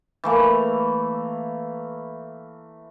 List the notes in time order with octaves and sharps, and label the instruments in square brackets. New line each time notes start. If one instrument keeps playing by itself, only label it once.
[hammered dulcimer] E3 A3 A#3